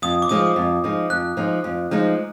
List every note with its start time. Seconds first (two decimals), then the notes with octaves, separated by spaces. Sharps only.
0.02 F2 D#6
0.22 D6
0.29 F3 G#3 D#4 D#6
0.56 F2
0.84 F3 G#3 D#4
1.10 F2 F#6
1.37 F3 G#3 D#4
1.64 F2
1.91 F3 G#3 D#4